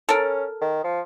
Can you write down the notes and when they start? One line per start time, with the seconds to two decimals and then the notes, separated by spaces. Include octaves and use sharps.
0.09 C#4 A4 A#4
0.61 D#3
0.84 F3